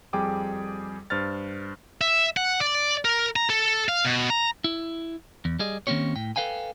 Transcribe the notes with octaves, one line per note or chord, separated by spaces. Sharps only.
F2 G3 G#4 G5 D6 D#6
G2 C5 F6 A6
E5
F#5
D5
A#4
A#5
A4
F5
B2
A#5
E4
E2
G3 G#4 D#5
D#3 A#3 C4 C#4 G4 C#5
A2 G5
A4 B4 F5 G5 G#5